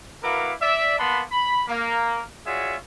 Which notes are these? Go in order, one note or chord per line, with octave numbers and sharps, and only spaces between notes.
E4 F#4 A#4 B4 F5 D6
D5 E5
A#3 B3 F#5 A5 B5 C6
B5
A#3
F4 F#4 G#4 C#5 D5 E5